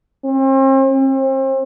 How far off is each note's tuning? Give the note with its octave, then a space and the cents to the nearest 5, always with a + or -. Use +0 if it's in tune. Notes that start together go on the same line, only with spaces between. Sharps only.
C4 +40
C4 +35